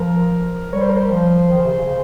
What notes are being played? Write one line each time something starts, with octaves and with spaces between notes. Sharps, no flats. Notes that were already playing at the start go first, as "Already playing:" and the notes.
Already playing: F3 A#4
G3 C#5
C5
A#4
C5
F3
D#3
C#3
C3
C#3
C#3